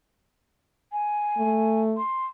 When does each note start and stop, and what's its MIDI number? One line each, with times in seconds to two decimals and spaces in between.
0.92 1.81 80
1.37 1.98 57
1.97 2.26 84